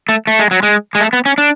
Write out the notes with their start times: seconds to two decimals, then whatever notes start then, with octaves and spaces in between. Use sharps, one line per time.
0.09 A3
0.27 A3
0.39 G#3
0.51 F#3
0.63 G#3
0.95 G#3
1.01 A3
1.13 B3
1.26 C#4
1.38 D4